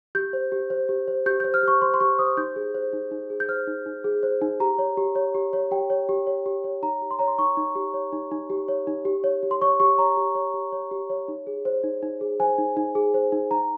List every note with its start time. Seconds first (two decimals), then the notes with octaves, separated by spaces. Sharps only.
0.15 G4 G6
0.33 C5
0.52 G4
0.70 C5
0.89 G4
1.08 C5
1.26 G4 G6
1.40 C5 G6
1.54 F6
1.63 G4 C#6
1.82 C5 C6
1.94 C6
2.00 G4 C#6
2.19 C5 D#6
2.37 D#4 G6
2.56 G#4
2.75 C5
2.93 D#4
3.11 D#4
3.30 G#4
3.40 G6
3.49 C5 F6
3.67 D#4
3.86 D#4
4.04 G#4
4.23 C5
4.42 D#4
4.60 G4 A#5
4.78 C#5
4.97 G4
5.15 C#5
5.35 G4
5.53 C#5
5.71 G4 G5
5.90 C#5
6.09 G4
6.27 C#5
6.46 G4
6.64 C#5
6.83 D#4 A#5
7.02 G4
7.11 C6
7.19 C#5 A#5
7.28 C6
7.38 D#4 C#6
7.57 D#4
7.75 G4
7.94 C#5
8.13 D#4
8.31 D#4
8.50 G4
8.68 C#5
8.87 D#4
9.05 G4
9.24 C#5
9.43 G4
9.51 C6
9.61 C#5 C#6
9.80 G4 C#6
9.98 C#5 A#5
10.17 G4
10.35 C#5
10.54 G4
10.72 C#5
10.91 G4
11.10 C#5
11.28 D#4
11.47 G#4
11.65 C5
11.84 D#4
12.03 D#4
12.21 G#4
12.40 C5 G#5
12.58 D#4
12.77 D#4
12.95 G#4
13.14 C5
13.32 D#4
13.51 D#4 A#5